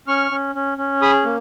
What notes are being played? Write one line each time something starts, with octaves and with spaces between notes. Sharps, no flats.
C#4 C#6 F6
C#4
C#4
C#4
G#4 B5 D#6
A#3